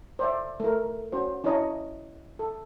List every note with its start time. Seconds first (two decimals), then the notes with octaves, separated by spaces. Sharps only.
0.19 C5 D5 E5
0.60 A3 A#4
1.12 C#4 F#4 C5
1.44 C#4 D4 E4 C#5 D#5 A#5
2.39 A4